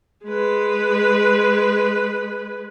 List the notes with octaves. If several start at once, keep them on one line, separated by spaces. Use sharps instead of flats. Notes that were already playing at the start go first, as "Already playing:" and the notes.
G#3 B4